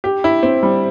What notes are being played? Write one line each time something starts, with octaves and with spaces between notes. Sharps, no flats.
G4
E4
C4
G3